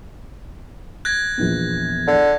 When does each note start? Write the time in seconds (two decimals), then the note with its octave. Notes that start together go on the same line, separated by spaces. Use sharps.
1.05 F#6 G#6 A#6
1.38 A#1 E2 B3
2.07 D3